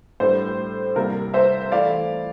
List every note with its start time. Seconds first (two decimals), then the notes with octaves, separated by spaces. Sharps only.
0.20 A2 G3 D4 C5
0.96 C3 G3 A#3 E4 A#4
1.34 C5 E5
1.72 E3 A3 E4 D5 F5